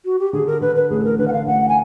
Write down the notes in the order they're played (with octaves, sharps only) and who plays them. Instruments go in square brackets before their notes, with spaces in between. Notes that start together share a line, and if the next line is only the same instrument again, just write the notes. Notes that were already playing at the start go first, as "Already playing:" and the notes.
[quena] F#4
G4
[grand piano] D3 [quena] G#4
[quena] A#4
[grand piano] D3 [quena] B4
[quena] B4
[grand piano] A1 [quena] G#4
[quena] A4
A#4
[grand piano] D3 [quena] B4
[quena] F#5
F5
[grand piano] A1 [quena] F#5
[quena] G#5